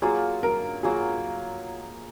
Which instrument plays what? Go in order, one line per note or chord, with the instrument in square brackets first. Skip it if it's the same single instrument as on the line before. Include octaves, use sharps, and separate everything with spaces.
[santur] F#3 A#3 F4 [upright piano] G#4
[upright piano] A#4
[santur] F#3 A#3 F4 [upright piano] G#4